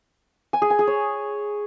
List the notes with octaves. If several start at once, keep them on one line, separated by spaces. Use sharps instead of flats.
G#5
G#4
G#5
G#4
C#5